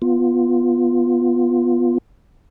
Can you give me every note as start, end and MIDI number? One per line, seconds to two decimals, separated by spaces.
0.02 1.98 59
0.02 1.98 65